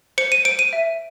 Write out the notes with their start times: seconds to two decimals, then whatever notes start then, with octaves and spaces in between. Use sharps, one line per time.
0.18 C5 C#7
0.32 D#7
0.45 C5 D7
0.59 D#7
0.73 E5